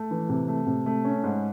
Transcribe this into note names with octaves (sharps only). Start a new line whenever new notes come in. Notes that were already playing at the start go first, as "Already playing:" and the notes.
Already playing: A3
E3
C3
A3
C3
A3
C#4
G#2